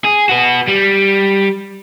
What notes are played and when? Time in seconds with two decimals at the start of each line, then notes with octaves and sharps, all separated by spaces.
0.04 G#4
0.29 F#4 B4
0.68 G3